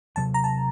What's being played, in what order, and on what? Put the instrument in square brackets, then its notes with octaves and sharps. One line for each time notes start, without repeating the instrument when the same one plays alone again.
[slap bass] C3 F#3 C4 [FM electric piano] A5
[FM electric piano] A#5
A5